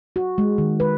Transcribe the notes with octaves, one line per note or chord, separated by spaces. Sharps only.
F#4
G#3
D#3
B4